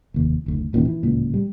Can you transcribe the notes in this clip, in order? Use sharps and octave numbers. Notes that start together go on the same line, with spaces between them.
F1 D#2
F#1 D2
E1 A#2 D#3 C#4
E3
D1 C#2 A#2
G3